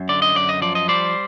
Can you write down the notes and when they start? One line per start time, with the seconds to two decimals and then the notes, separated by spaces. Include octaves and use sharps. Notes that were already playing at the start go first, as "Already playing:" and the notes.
Already playing: F#2
0.09 D3 D5
0.22 D#5
0.36 F#2 D5
0.49 D#5
0.62 F3 D5
0.75 D#5
0.88 G3 C5 D5